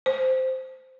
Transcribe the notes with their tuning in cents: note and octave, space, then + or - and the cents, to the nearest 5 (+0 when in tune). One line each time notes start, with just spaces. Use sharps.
C5 -5